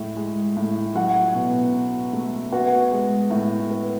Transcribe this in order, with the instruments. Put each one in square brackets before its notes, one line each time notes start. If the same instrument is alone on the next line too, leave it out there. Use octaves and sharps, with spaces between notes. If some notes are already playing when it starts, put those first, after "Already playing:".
Already playing: [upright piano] A2 G#3
G#3
A2
F#3 F#4 F#5
B2
B2
A3
B3 F#4 F#5
G#3
A2
B3